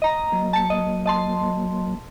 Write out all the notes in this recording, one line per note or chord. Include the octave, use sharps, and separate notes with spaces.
D#5 A#5
F#3 A#3
A5 C#7
D#5
D#5 A5 C6